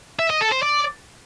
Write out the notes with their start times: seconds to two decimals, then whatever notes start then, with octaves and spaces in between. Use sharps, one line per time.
0.19 E5
0.30 D#5
0.41 A4
0.52 C5
0.62 D5